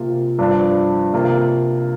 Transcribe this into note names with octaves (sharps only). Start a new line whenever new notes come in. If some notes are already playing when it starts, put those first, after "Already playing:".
Already playing: C3 A#3 F4
G2 F3 D4
C3 A#3 F4